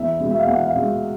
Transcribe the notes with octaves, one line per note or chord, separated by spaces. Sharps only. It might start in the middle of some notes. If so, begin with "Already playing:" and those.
Already playing: E2 E5
B2 G#3
E5
F5
E2 F#5
F5
B2 G#3